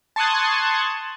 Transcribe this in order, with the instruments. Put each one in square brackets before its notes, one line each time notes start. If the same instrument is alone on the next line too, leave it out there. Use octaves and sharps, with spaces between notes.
[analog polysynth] A5 C6 C#6 D#6 F#6 G#6